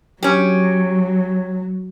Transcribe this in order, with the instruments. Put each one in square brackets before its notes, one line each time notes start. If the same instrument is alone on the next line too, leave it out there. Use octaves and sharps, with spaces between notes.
[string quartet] F#3 [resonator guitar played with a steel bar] C#4 G4